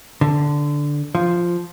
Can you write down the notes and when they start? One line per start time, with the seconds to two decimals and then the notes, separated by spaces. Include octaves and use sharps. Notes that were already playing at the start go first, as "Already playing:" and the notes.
0.21 D3
1.15 F3